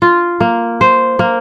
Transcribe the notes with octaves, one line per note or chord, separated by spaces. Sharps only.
F4
A#3
C5
A#3